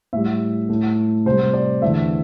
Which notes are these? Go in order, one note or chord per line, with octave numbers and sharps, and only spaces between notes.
A2 G3 E5
A2 A3
C3 G3 C5
D5
E2 D3 A3 E5